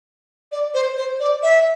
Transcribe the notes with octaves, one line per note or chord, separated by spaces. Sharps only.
D5
C5
C5
D5
E5